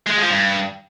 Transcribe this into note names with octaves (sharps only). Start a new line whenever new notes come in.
G#3
F3
G2